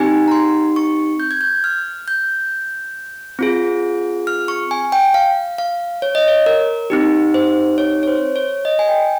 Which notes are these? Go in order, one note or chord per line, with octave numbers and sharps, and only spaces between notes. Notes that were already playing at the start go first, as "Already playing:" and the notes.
Already playing: C4 D#4 G4 G#5
A#5
C6
C#6
G6
G#6
G6
F6
G6
C4 F4 G#4
F6
C#6
G#5
G5
F5
F5
C#5
D#5
C#5
A#4
C4 D#4 G4
C5
C#5
C#5
C5
C#5
D#5
G#5
G5